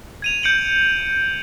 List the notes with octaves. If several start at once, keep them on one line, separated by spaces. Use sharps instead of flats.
G#6 D#7 F7
G6 C#7 D7 F#7